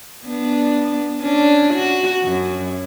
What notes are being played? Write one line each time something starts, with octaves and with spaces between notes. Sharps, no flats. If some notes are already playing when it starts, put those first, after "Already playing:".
B3 D4
C#4 D4
F#4
F#2